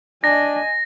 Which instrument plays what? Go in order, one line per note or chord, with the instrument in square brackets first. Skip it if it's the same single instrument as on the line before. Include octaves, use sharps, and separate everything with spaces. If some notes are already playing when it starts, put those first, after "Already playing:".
[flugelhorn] D4 [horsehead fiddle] D#5 G#5 [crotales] A#6